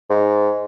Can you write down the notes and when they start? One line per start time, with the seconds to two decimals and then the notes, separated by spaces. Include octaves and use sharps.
0.10 G#2